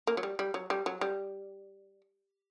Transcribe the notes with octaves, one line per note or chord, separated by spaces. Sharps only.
A#3
F#3
G3
G3
F#3
G3
F#3
G3